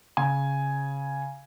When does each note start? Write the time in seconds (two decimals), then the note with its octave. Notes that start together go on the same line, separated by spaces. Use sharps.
0.17 C#3 G#5